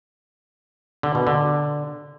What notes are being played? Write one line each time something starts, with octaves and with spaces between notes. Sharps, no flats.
D3
B2
D3